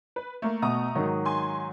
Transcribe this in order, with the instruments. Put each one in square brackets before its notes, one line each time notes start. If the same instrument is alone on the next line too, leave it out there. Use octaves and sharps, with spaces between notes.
[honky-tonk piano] B4
A3 A#3
[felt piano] B2 [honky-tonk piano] A3 A#5 D#6
[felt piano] G#2 D#3 F#3
[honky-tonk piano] G#5 C6